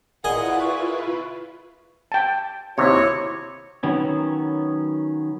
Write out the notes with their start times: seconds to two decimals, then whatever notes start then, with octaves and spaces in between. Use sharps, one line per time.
0.24 A#2 E4 F4 G#4 B4 D#5 F#5 G#5
0.60 C#6
2.12 G5 A5
2.78 D#2 C3 E4 F#4 C#5
3.83 D#3 F#3 B3 C#4